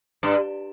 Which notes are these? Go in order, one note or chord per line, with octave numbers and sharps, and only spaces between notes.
G2